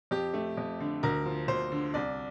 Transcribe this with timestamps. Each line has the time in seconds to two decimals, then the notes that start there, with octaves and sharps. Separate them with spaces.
0.11 F2 G4
0.34 A3
0.57 F2
0.80 D3
1.03 D2 A#4
1.26 F3
1.48 D2 C5
1.72 D3
1.94 C2 D5